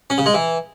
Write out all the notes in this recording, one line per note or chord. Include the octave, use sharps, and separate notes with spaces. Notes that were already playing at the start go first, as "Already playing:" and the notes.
C#4
C#3
G#3
E3